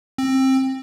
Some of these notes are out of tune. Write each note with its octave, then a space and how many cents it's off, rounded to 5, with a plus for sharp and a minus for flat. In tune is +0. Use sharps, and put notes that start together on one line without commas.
C4 +20